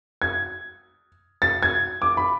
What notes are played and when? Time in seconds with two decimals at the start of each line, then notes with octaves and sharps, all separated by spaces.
0.22 G#6
1.42 A6
1.63 G#6
2.02 D6
2.17 B5